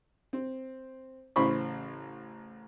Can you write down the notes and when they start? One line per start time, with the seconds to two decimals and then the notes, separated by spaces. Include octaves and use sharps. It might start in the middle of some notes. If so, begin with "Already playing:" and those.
0.33 C4
1.36 A1 C#3 E3 C5 B5 C#6